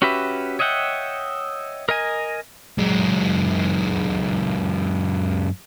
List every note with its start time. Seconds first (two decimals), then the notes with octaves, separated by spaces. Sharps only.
0.02 C#4 F#4 G4 B4 E5
0.59 C#5 D#5 E5 F#5 G5
1.89 A#4 D#5 G#5
2.78 F#2 G#3